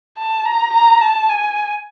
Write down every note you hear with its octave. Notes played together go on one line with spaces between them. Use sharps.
A5
A#5
A#5
A5
G#5